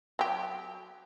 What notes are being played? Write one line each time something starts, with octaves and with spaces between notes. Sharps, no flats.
F#3 G4